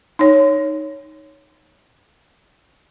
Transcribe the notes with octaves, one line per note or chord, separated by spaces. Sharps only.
D#4 C#5